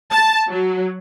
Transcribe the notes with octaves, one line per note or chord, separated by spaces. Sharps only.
A5
F#3